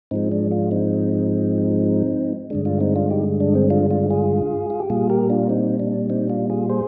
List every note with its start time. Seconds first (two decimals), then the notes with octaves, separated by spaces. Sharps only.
0.11 G#2 F3 G#3 C4 D#4
0.32 D4
0.51 D4 F4
0.71 C4 D#4
2.50 G2 D3 G#3 D4
2.65 D4 F4
2.80 C4 D#4
2.96 D4 F4
3.10 D#4 G4
3.40 D4
3.55 C4
3.70 D4 F4
3.91 D4 F4
4.10 F4 G#4
4.70 F4
4.80 G4
4.90 A#2 G3 F4 G#4
5.10 G4 A#4
5.30 D4 F4
5.49 C4 D#4
5.80 D4
6.10 C4 D#4
6.29 D4 F4
6.50 F4 G#4
6.69 G#4 C5